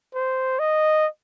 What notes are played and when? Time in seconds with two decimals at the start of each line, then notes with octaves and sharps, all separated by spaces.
0.14 C5
0.59 D#5